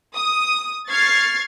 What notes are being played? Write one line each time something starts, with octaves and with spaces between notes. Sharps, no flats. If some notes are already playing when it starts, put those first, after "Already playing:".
D#6
C#6 F6 G#6 A6 C7